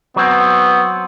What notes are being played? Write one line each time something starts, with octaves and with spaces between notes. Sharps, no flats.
F#3 B3 C4